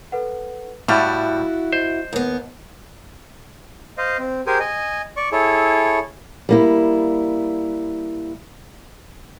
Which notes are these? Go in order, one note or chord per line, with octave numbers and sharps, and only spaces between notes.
A4 B4 F#5
A2 G3 E4 F#4 F5 F#6 A6
C5 D#5
D#2 B3
C5 D#5 F5
C4
G4 G#4 A#4 C5 G#5
D#5 G#5
D5 C#6
E4 G#4 A4 C#5
G3 A#3 E4